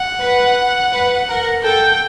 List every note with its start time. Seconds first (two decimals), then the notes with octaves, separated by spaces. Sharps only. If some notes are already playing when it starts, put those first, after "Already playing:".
Already playing: F#5
0.21 B4
0.92 B4
1.29 A#4
1.64 A4 G5